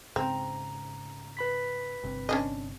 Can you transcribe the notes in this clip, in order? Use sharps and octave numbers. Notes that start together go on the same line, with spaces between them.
G#2 C#3 C4 A#5
B4 B5 B6
G1 C3
C#4 D4 D#5